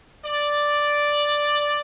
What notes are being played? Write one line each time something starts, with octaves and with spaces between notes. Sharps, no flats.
D5